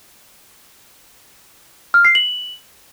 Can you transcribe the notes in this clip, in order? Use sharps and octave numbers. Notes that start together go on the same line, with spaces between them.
F6
C7
F#7